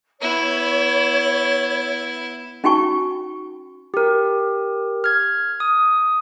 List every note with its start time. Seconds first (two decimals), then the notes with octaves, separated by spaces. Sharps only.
0.21 B3 E4 C#5
2.64 C#4 D#4 F#4 G5 G#5 C#6
3.94 G4 A#4
5.04 F6 G#6
5.60 D#6